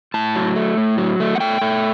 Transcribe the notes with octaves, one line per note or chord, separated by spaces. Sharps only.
A2 A5
F#3
A3
A2
F#3
A3
F#5
A3 G5
A3